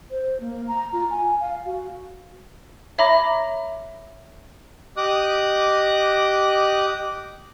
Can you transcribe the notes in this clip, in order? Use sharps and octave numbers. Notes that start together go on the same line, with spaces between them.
C5
A#3
A#5
F4
G#5
F5
F#4
C#5 E5 A#5 B5 D6 A#6
G4 D#5 D6 D#6 F#6